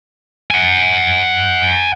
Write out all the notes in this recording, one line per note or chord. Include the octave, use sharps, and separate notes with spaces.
F#5 G#5